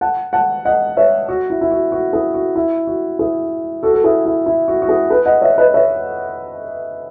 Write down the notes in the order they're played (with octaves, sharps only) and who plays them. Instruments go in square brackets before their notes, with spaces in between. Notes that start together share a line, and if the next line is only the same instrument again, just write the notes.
[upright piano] F#5 A5
F#5 A5
D#5 F#5
C#5 E5
F#4
E4
E4
F#4
F#4
E4 G#4
F#4
E4
F#4
E4 G#4
F#4 A4
A4
E4 G#4
E4
E4
F#4
F#4
E4 G#4
G#4 B4
D#5 F#5
C#5 E5
B4 D#5
C#5 E5